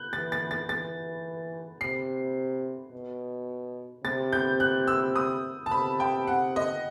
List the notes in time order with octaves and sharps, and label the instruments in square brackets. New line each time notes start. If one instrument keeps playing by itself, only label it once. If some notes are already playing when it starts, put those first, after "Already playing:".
Already playing: [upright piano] F#6 G6
[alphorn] E3 [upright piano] A6
[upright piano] A6
A6
[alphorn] E3 [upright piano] A6
[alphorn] C3 [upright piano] C7
[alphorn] B2
[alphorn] C3 [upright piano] A6
[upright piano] G6
F#6
E6
D#6
A5
[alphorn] C3 [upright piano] B5
[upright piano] G5
F#5
D#5